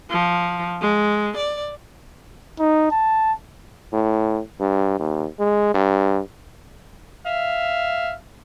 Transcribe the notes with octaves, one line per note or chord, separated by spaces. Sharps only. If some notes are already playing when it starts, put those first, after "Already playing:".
F3
G#3
D5
D#4
A5
A2
G2
D#2
G#3
G2
E5 F5